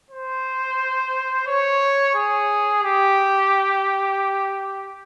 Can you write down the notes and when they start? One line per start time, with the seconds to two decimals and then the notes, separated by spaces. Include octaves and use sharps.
0.10 C5
1.47 C#5
2.15 G#4
2.83 G4